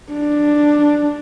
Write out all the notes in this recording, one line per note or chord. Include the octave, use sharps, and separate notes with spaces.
D4